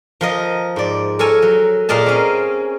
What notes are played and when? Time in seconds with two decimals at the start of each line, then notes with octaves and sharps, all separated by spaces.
0.21 F3 A#4 D#5
0.76 G#2 D5
1.19 A4 A#4 C#5 G#5
1.42 F#3
1.89 A#2 G#4 A#4 D#5 A5
2.06 C4 C#4